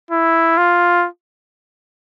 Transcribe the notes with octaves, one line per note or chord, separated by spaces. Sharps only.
E4
F4